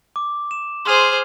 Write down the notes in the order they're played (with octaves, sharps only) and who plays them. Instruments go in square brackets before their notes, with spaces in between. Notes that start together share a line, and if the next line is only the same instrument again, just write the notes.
[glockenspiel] D6
E7
[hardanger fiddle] G#4 C5 [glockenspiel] C6 F6 F7